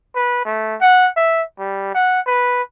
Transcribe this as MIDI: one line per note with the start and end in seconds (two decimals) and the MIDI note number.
0.15 0.42 71
0.45 0.76 57
0.81 1.09 78
1.16 1.43 76
1.59 1.94 55
1.94 2.20 78
2.27 2.62 71